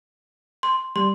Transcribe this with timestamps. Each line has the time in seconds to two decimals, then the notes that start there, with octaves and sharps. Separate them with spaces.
0.63 C6
0.96 G3 C6